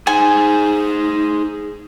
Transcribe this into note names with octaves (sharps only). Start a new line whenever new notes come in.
D#4 G#4 C5 G#5